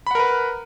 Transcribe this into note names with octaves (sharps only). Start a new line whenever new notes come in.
A#4 B4 F#5 B5